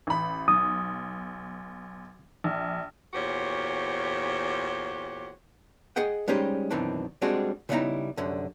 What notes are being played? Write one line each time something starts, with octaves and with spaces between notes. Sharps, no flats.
A1 B5
B1 D#6
A#1
E2 A#2 F#4 G4 C5 C#5
G#4 D#5 F#5 G5
G3 G#3 C#4 D#4 G4 C5
F#2 B2 D#3 E3 C4 D4
G3 G#3 C4 D4 F#4 G#4
C#3 G3 B3 D#4 E4 A#5
C2 F#2 D3